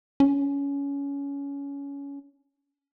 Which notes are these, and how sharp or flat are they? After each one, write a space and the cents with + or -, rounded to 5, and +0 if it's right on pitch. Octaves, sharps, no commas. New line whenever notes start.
C#4 +20